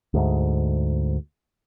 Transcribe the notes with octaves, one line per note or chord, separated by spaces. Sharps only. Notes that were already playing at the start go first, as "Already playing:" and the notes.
D2 G#2